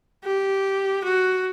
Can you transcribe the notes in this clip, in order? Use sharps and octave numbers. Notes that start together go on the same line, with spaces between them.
G4
F#4